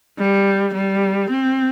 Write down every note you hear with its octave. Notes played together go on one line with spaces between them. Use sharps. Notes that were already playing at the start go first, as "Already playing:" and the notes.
G3
G3
C4